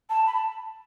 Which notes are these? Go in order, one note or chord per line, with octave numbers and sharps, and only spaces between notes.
A5
B5
A5